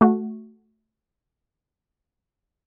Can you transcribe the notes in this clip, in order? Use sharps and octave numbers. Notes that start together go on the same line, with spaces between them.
A3 F#4